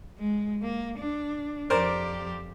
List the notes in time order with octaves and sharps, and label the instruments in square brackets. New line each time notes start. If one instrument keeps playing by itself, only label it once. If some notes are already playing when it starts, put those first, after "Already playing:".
[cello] G#3
A#3
D4
[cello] F2 G4 [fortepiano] A#4 C5 D5